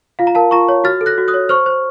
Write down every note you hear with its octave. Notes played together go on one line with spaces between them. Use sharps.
F4 F5
A#5
A#4 F5 A5
F4 A#5 C#6
C#5
F#4 F6 A6
A4
F#6 A#6
F#4
D#6 F#6
C#5
C5 C#6 F6
C5